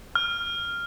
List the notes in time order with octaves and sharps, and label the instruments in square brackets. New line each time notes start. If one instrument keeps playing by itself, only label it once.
[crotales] F6